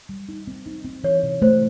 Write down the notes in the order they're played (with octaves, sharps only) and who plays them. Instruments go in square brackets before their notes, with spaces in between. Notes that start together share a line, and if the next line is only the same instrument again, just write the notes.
[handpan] G3
D#4
C4
D#4
C4
[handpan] E3 [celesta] C#5
[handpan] C3
[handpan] A3 [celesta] C5